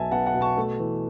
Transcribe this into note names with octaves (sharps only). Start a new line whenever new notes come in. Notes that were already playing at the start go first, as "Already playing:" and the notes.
Already playing: B1 B2 E5 G#5 A5
B3 F#5 A5
F#5 A5
B2
A5 C#6
A3
E3